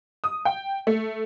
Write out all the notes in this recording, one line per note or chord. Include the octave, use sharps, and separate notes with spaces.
D#6
G5
A3